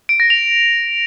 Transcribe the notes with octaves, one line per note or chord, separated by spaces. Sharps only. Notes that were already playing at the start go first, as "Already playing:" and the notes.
D7
A#6
F7